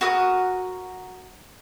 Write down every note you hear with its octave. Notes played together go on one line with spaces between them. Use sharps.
F#4 A#4 D#6 F#6